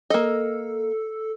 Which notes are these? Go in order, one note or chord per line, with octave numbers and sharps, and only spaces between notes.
A#3 A4 D#5